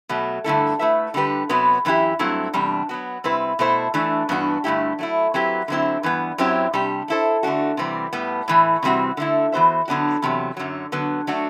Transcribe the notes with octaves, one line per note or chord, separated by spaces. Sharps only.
B2 F#3 A3
G2 D3 A3 E4 A4
A3 E4 B4 E5
D3 G3 D4 G4 B4
C3 F#3 B3 F#4 B4
F#2 E3 B3 E4 G4
G2 F#3 A3 C4 E4
E2 C3 G3 D4
F#3 B3 F#4
C3 G3 C4 E4 B4
B2 A3 E4 A4 C5
E3 A3 D4
G2 E3 B3 D4 F#4
G2 D3 A3 E4 G4
F#3 A3 E4
F#3 C4 E4 G4 B4
D3 F#3 C4 E4
G2 E3 B3
F#2 F#3 C4 E4 G4
C3 G3 D4 G4
A3 E4 A4 C5
D3 A3 D4 F#4
C3 E3 G3 C4
A2 G3 B3
A2 E3 A3
C3 E3 G3 C4 F#4
D3 A3 E4
E3 B3 F#4 C5 E5
D3 F#3 B3 D4 F#4
E2 C3 F#3
F#2 D3 F#3
D3 F#3 B3
F#3 A3 D4 F#4